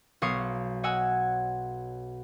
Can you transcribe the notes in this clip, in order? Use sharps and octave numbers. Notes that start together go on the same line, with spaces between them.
B1 F5 C#6 D#6 C7
C#5 D#5 F#5 G#5 E6